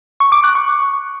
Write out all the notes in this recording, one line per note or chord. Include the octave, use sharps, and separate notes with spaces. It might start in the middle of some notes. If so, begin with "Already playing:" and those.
C#6
D6
F#6
C#6